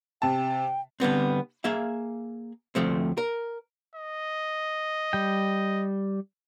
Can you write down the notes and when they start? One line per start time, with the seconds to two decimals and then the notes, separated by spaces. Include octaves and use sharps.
0.22 C3 G5 A5
1.00 D3 G3 B3 C4
1.64 A#3 G#4 E5 F5
2.75 D2 F3 A3 C4
3.18 A#4
3.95 D#5
5.13 G3 G5